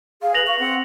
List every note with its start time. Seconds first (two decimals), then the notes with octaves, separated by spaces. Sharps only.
0.22 G#4 F5
0.34 B4 A#6 F7 F#7
0.47 F5 C#6
0.59 C4 F#5